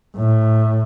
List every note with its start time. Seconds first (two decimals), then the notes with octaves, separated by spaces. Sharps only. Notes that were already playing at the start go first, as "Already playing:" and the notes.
0.16 A2